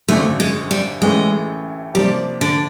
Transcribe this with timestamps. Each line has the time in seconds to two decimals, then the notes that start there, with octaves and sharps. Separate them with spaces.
0.08 G#1 F#2 D3 A3
0.40 G#3
0.71 G3
1.01 A1 A2 E3 G#3 A3 C#4
1.94 C3 F3 G3 A#3 D4
2.41 D3